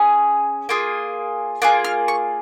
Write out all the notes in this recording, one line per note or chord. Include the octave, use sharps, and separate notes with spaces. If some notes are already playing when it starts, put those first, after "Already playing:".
Already playing: C#4 G#4
A#3 F4 G#4
A#3 F4 G#4 F#6
F6
C#6